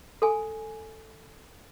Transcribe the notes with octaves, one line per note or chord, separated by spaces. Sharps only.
A4 G#5